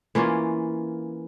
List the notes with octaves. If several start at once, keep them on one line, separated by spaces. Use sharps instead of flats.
E3 A#3 C#4 F4